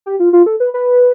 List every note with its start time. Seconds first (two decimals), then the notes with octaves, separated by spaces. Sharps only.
0.06 G4
0.20 F4
0.33 F4
0.46 A4
0.60 B4
0.74 B4